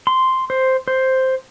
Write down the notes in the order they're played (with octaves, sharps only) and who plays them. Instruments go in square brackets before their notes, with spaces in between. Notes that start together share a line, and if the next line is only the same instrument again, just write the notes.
[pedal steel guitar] C6
C5
C5